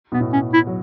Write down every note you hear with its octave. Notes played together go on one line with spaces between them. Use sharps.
B2 B3
A2
C#4
E4
F#3